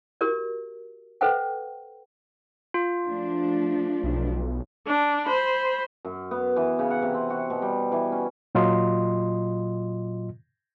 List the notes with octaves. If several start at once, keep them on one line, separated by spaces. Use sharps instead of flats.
F#4 G4 A#4 D5
A4 B4 C5 E5 F#5 G5
F4
F3 A3 D4
B1
D4
C5 B5
F#2
B3
E3
C#3
F#5
C3
C4
F#4
B2
G3
E3
C#4
A#2 F#3 F4 D#5 C6